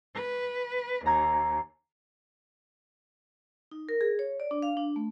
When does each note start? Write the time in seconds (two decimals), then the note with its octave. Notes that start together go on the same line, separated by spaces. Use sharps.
0.15 B4
1.06 D#2 A#5 G#6
3.71 D#4
3.89 A#4
4.01 G#4
4.19 C#5
4.40 D5
4.51 D4
4.62 F5
4.77 D4
4.96 A3